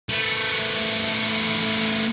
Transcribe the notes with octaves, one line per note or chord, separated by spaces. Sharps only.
A3 B3